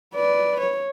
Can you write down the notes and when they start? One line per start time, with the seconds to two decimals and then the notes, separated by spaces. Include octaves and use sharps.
0.15 B4 D5
0.60 C#5